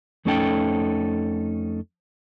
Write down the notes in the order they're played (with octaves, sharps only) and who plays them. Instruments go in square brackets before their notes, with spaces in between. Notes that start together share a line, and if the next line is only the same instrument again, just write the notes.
[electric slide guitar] F2 A3 C#4 D#4 A4 G5